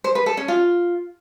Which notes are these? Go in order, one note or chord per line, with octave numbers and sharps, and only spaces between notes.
C5
B4
A4
C#4
F4